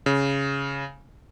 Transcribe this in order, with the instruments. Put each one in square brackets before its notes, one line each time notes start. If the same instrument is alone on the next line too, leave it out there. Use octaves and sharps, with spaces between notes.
[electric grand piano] C#3